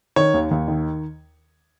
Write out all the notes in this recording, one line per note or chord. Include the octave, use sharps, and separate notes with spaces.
D#3 C#5
D#2
D#2
D#3